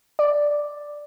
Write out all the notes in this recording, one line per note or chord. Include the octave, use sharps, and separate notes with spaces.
D5